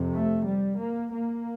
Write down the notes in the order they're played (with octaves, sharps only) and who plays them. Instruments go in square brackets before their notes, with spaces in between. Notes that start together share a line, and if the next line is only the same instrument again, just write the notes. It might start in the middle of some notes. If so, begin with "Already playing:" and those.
Already playing: [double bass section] F2 C3
A3
G3
A#3
A#3